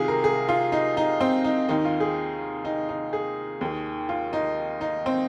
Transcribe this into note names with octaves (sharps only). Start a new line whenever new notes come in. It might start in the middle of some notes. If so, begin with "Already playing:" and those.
Already playing: C2 C3 D#3 F4 G#4
A#4
G#4
F4
D#4
D#4
C4
D#4
D#2 D#3 D#4
F4
G#4
D#4
D#4
G#4
D#2 D#3
F4
D#4
D#4
C4